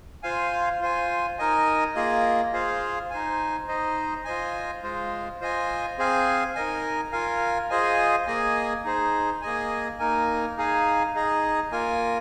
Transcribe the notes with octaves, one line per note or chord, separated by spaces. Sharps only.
F4 C5 F5 G#5
F4 C5 G#5
D#4 A#4 D#5 G#5
A#3 F4 G#4 D#5
F4 G#4 C5 F5
D#4 C5 G#5
D#4 C5 D#5
F4 C5 D#5 G#5
G#3 F4 C5
F4 C5 D#5 G#5
C4 G#4 C5 F5 G#5
D#4 A#4 D#5 G#5
F4 A#4 F5 G#5
F4 G#4 C5 D#5 G#5
A#3 G#4 D#5 G#5
D#4 G#4 C5
A#3 G#4 D#5 G#5
A#3 D#4 A#4 G#5
D#4 G#4 F5 G#5
D#4 G#4 D#5
A#3 F4 A#4 G#5